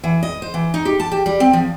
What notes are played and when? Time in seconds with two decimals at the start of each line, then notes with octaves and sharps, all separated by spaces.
0.04 E3
0.23 D#5
0.42 C5
0.54 E3
0.74 D#4
0.85 G4
1.00 A5
1.12 G4
1.26 G3
1.40 C4
1.53 F3